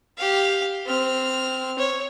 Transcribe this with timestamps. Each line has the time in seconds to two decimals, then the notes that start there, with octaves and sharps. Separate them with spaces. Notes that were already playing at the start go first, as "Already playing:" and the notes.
0.17 G4 F5
0.86 C4 F6
1.79 C#5